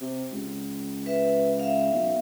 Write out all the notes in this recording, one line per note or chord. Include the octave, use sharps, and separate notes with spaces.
C3
C#2
B4 E5
E5 F5
B1